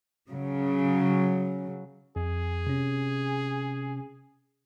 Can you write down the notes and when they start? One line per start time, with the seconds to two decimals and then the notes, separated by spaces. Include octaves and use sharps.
0.30 C#3 F#3
2.16 F2 G#4
2.67 C3 C#4